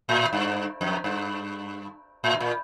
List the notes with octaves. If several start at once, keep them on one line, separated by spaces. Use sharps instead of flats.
A2
G2
F2
G2
A2
A#2